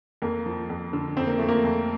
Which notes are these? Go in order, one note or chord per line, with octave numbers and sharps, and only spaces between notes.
F2 A#3
F3
F2
D3
F2 C4
A#3
F3 A3
A#3
F2